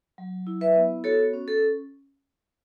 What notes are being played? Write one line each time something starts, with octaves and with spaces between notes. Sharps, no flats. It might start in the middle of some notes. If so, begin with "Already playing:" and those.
F#3
E4
B4 E5
B3
F#4 A4 C#5
C#4
A4